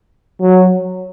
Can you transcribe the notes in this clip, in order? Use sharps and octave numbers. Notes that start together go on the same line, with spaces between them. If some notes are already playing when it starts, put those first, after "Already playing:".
F#3